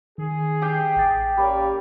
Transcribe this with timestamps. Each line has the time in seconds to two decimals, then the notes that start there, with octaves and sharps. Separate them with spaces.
0.18 D#3 G#4
0.62 G4 G5
0.96 A1 A6
1.37 G3 A#3 C#4 D5